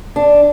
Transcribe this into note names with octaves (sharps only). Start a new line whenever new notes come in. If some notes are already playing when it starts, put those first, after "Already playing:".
D4